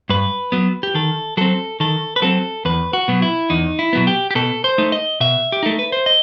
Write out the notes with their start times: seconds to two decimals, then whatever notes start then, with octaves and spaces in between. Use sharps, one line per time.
0.09 G2 B4
0.52 F#3 B3
0.83 G4
0.95 D#3 A4
1.37 F#3 C4 A4
1.80 D#3 A4
2.16 B4
2.22 F#3 C4 A4
2.65 E2 B4
2.93 F#4
3.08 B2 F#3 B3
3.22 E4
3.50 E2 D#4
3.79 E4
3.93 B2 F#3 B3
4.07 G4
4.31 G4
4.35 B2 A4
4.64 C5
4.78 A3 D#4
4.92 D#5
5.20 B2 E5
5.52 G4
5.63 A3 D#4 A4
5.79 B4
5.92 C5
6.06 D#5